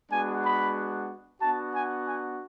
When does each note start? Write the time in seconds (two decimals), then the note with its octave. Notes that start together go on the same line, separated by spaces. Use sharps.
0.11 G#3 B3 D4 F#4 G#5
0.44 B5
1.41 B3 D4 F#4 A5
1.73 G#5
2.06 G#5